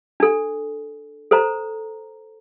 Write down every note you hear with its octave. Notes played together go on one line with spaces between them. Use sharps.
D4 A4
A4 C5 A#5